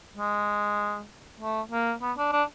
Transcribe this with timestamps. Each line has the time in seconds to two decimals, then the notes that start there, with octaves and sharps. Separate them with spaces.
0.17 G#3
1.40 A3
1.71 A#3
2.02 B3
2.18 D4
2.32 D4